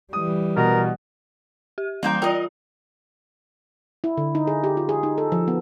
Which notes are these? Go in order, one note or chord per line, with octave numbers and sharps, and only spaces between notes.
E3 G3 D#6
B2 A#4
G4
E3 G3 A#3 C5 G5 A#5
F4 A#4 D5 D#5 G5
E4
D3
D#4
G#4
G4
F4
G#4
D#4
A4
F3
B3